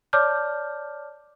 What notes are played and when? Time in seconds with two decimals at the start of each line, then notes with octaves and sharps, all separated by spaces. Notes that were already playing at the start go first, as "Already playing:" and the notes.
0.13 C#5 D5 A5 D6 F6 G6